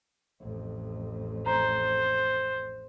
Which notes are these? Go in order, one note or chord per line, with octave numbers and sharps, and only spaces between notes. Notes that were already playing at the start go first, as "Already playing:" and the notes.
A1 F2
C5 A#5